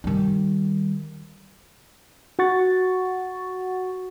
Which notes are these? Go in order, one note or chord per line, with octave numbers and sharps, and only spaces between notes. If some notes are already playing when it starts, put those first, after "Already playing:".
D#3 G3
F#4 F#5 C#6 A6